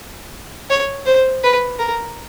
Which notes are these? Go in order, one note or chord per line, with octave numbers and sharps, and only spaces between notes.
C#5
C5
B4
A#4